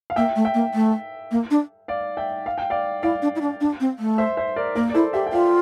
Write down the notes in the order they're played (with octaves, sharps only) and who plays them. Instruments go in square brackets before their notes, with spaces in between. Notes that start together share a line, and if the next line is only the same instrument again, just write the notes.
[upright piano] F5
[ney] A#3 [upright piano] E5 G5
[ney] A3
[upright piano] E5 G5
[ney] A#3
A3
A#3
D4
[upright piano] D5 F5
E5 G5
F5
G5
D5 F5
[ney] E4 [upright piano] D5 F5
[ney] D4
E4
D4
D4
C4
A3
[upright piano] C5 E5
C5 E5
A#4 D5
[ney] A#3 [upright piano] A#4 D5
[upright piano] D5
[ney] E4 [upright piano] A4 C5
[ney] G4 [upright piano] E5 G5
[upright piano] G5
[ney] F4 [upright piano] D5 F5